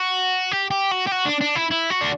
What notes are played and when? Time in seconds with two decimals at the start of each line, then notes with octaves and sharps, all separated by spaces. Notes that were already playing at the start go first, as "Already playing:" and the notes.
Already playing: F#4
0.52 G4
0.71 G4
0.91 F#4
1.07 G4
1.11 F#4
1.25 D4
1.41 D4
1.55 E4
1.71 E4
1.90 F#4
2.01 D4